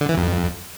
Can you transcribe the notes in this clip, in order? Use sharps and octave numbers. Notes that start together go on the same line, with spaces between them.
D3
E3
F2